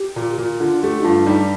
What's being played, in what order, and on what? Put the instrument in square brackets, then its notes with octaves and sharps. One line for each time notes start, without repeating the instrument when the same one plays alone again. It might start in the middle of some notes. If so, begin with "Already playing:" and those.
Already playing: [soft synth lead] G4
[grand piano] A#2
A#2
[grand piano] D3 [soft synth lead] F4
[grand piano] A3 [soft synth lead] G4
[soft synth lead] D#4
[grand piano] G2 [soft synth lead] F4
[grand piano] G3 [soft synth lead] D#4